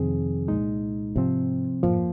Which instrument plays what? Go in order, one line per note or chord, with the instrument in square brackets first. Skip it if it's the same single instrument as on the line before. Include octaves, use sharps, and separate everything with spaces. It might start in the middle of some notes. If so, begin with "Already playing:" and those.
Already playing: [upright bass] F2 [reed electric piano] C3 D#3 C4 G#4
[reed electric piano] C2 A#2 G#3 D#4
[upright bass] G#2 [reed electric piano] C3 F3 C4
[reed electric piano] F2 F3 A#3 [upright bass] G#2